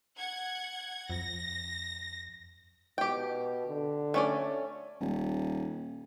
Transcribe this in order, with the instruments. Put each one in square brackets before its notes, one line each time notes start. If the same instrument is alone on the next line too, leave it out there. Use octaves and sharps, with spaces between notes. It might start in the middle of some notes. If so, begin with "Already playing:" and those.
[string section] F#5 G#6
[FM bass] F2 [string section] A#6
[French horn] B2 [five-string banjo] G4 G5
[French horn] D3
[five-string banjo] A3 C#4 D5
[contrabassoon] D#1